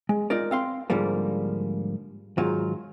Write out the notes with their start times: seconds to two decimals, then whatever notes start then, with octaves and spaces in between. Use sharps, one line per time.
0.09 G#3
0.30 D#4 F4 A#4 D5
0.51 C4 F5 C6
0.90 G#2 D3 F3 G3 A#3
2.38 G#2 D#3 F#3 F4